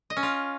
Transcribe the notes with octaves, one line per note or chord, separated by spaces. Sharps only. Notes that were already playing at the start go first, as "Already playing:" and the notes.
D#5
C#4
F4